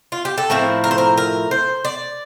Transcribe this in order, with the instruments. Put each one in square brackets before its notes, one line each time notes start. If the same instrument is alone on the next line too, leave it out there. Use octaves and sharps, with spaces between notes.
[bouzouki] F4
G4
A4
A2 F3 C4 E4 A#4
A#4
C5
A#4
A#4
C5
D5